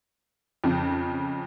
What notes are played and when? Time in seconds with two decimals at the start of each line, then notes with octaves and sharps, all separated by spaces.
0.64 F2 C#3